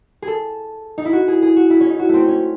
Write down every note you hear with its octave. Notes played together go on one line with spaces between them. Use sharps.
G#4
A4
D#4
E4
F#4
G#4
G#4
F#4
E4
C#4
D#4
F#4
A3 C4
C#4